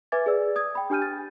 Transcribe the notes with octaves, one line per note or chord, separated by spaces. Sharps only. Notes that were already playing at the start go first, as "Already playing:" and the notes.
B4 E5 G#5 D6 G#6 A6
G#4 B4 D5 E6
D#6 G#6
G5 B5
D4 G4 G#5 F6 G6 D#7
A6